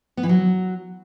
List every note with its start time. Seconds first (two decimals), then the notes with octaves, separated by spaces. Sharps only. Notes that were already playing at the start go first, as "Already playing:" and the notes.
0.17 B3
0.23 E3
0.29 F#3